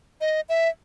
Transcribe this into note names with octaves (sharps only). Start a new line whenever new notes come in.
D#5
E5